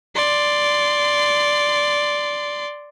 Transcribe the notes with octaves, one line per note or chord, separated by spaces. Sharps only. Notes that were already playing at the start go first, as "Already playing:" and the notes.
D5 C6